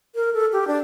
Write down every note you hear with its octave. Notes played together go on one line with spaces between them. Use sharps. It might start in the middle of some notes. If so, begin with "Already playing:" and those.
A#4
A4
G4
D4